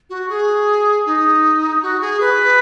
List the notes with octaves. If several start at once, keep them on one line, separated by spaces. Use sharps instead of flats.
F#4
G#4
D#4
F#4
G#4
B4